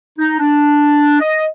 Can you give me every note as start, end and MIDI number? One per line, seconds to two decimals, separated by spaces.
0.18 0.33 63
0.39 1.19 62
1.20 1.46 75